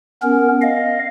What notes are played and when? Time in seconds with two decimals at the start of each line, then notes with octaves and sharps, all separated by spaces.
0.23 B3 C#4 A#4
0.62 D#5 F5